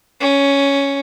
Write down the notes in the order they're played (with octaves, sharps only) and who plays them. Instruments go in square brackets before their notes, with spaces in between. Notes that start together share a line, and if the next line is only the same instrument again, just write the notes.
[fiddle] C#4